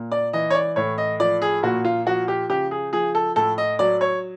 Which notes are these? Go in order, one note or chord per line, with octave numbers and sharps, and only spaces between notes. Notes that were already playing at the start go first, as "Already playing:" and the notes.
Already playing: A#2
D5
E3 D#5
C#5
D5
A2 C#5
D#5
F3 D5
G#4
A#2 F#4
F4
F3 F#4
G4
C#3 G4
G#4
F3 G#4
A4
A2 A4
D#5
F#3 D5
C#5